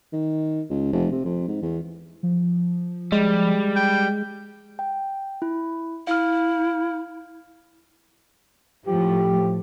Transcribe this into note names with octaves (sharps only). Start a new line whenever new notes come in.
D#3
C#2
F1
C3
F2
G#2
E2
F3
G3 G#3
G5
G5
E4
E4 F5 F6
A2 F3 G4